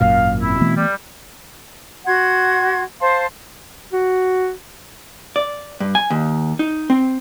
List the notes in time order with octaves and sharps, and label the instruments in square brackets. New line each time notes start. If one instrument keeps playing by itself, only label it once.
[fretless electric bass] G#1 F#2 A#2 [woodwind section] F5
[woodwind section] B2 C4 E4
[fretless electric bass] E3 A3 B3
[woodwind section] G3
[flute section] F#4 F#5 C6 G#6
C5 F5 A5 C6
[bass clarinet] F#4
[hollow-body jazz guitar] D5
G2
G#5
D#2
D#4
C4